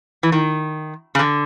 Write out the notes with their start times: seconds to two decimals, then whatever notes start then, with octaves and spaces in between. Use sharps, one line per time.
0.23 E3
0.32 D#3
1.15 C#3
1.19 D3